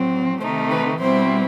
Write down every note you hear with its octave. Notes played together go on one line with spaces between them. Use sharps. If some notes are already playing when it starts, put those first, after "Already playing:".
Already playing: A2 F#3 C4
C3 D#3 A3 D#4 C5
B4
B2 G3 C4 E4 C5